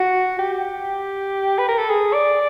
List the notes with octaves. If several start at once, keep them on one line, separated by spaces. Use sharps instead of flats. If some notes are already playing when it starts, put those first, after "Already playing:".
Already playing: F#4
G4
B4
A#4
A4
G#4
D5